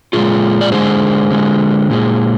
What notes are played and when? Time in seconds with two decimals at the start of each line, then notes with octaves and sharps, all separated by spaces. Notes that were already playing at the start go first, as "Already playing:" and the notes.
0.13 A#2 G#3 F4 G#4
0.61 D5
0.72 D3 G#3 G#4 C5
1.31 D3 G#3
1.90 A#2 G#3